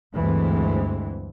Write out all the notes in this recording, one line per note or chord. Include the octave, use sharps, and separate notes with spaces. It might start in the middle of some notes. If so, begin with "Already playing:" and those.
D2 G2 D3 E3 G#3 C4